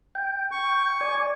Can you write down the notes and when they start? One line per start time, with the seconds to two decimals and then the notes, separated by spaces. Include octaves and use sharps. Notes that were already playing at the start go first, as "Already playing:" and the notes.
0.15 G5
0.51 C#6
1.01 D5 G#5